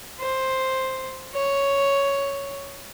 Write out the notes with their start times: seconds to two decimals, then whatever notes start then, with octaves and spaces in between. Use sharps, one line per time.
0.20 C5
1.33 C#5